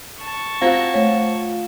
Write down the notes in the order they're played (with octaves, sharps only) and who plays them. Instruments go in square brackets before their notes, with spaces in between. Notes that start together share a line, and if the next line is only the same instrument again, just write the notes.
[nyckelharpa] A5 C#6
[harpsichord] C4 F#4 [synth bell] F4 F5
[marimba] A3 C#5